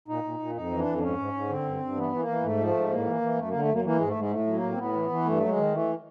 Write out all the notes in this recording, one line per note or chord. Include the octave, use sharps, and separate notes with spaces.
A#2 D#4
A#2
A#2
F2 D#4
E3
D4
F2
D4
G#2 C#4
G#2
G#2
D3 C4
G2
G2
E3 B3
E3
A#3
E3
G#2 A3
F3
A3
G#2
A2 A#3
E3
E3
F#2 A3
D3 A#3
A3
F#2 A#3
E3 A#3
G#2 G#3
A3
G#2 G#3
A2 A3
F#3
A#3
A2
C4
A2 B3
E3
E3
G2 A3
F#3
G#3
D#3
E3 A3